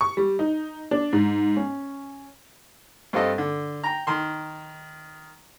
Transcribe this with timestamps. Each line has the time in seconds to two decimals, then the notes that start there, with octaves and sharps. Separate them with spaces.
0.01 C#6
0.17 G3
0.39 D#4
0.91 D4
1.13 G#2
1.56 C#4
3.13 G2 C4 F4 A4 D#5
3.38 D3
3.84 G5 A#5
4.07 D#3 C6